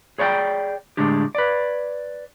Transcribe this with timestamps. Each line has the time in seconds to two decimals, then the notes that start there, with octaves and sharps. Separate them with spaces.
0.18 G#4 C#5 D5 F#5 G5
0.97 A2 D3 G#3 D4 G4
1.35 B4 D5